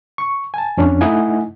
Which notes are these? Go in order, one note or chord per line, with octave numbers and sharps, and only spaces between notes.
C#6
G#5 A5
F2 C#4 D4
A3 D#4 E4 D#5 F#5 G#5